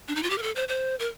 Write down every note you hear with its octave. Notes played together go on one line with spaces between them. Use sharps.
D4
D#4
F4
G4
A#4
A4
C5
C5
A#4